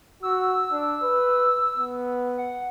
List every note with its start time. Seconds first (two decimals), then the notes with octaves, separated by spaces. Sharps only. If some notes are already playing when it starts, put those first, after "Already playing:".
0.23 F#4 E6
0.72 D4
1.03 B4
1.77 B3
2.38 F#5